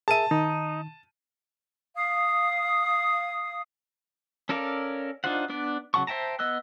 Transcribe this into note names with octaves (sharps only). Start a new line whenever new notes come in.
G#4 A#4 E5 A5 D#7
D#3 D#4
F5 D#6
C#4 A4 A#4 D5 F5
D4 D#4 F4 C5 F#5
B3 D4 D5
C#3 F#3 F#5 A5 C#6
C5 E5 G5 A5 A#5
B3 D#5 E6 F#6